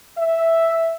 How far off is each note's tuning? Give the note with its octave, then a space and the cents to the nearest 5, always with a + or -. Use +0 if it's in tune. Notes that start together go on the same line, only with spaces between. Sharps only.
E5 +0